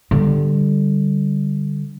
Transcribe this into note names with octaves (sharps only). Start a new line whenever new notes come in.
D3 G3